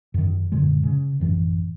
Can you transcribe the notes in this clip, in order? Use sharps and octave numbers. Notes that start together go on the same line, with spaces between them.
F#2 D#3
F#2 A#2 D3 G#3
C#3
A1 F#2 E3